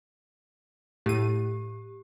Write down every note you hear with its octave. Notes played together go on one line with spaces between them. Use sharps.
A2 G4 D#7